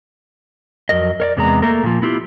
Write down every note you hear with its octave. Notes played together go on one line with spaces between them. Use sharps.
F2 F#3 A#4 D#5
A#4 C#5 D5
E2 C3 G#3 B3 A#5
A3 A#3 A4 A#4
A#2 D#3 F3
B3 E4 F4 G4